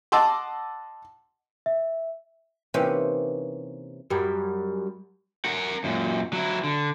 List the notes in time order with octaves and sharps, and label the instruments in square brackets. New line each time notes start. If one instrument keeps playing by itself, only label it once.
[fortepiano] D#5 F#5 A5 C6 D6 E6
[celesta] E5
[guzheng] C3 E3 A#3 C#4 D#4 G4
[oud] F#2 G3
[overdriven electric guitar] A#4 F#5
F#2 A#2
F#3 E4
D3